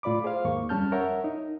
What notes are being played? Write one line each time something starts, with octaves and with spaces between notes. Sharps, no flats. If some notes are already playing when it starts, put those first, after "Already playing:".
A2 F4 D5 B5 D6
G#4 C5 F5
D#2 G#2 A#3 C#6
F2 G3 C#4 A5 F6 G6
A#4 C#5 E5 F#5
D#4